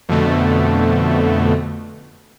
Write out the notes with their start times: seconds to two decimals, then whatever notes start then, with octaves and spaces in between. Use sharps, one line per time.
0.09 F2 B2 D3 A3